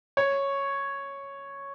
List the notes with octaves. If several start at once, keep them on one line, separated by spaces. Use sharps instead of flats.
C#5